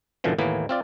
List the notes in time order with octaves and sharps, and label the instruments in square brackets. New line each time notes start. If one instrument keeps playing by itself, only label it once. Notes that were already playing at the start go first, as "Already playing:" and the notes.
[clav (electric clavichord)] F#2 A#2 D3 E3 F3
D#2 A2 E3 A#3 B3
C4 F4 D5